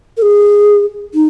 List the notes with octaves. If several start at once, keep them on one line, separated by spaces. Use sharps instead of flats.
A#4
G#4
D#4